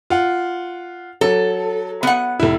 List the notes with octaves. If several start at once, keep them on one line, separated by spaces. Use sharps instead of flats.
F4 F#5
F#3 A4
B3 F#5
F1 E4